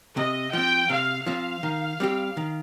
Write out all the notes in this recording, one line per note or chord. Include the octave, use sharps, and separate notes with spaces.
C3 D#5
F3 C4 G5
C3 F5
F3 C4 F5
D#3
G3 C4 G4
D#3